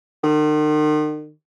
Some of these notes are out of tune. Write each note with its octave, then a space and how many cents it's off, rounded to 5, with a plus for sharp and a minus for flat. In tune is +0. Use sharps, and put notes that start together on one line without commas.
D#3 -40